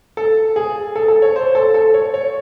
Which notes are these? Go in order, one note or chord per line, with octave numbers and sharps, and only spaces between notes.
A4
G#4
A4
A4
C#5
C5
A4
A4
C#5
C#5